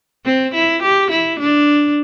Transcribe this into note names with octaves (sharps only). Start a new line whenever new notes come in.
C4
E4
G4
E4
D4